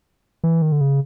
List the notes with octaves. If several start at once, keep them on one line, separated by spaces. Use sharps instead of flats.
E3
D#3
D3
C#3